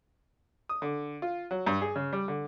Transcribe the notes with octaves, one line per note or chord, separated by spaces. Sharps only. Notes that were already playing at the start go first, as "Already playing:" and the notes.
D#6
D3
F4
F#3
G2
G#4
C#3
G3
D3